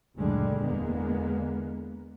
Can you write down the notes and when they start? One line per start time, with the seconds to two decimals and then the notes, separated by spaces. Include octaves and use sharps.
0.17 F#1 D2 A#2 D3 G3 G#3
0.61 E2 D3 G#3 A#3 B3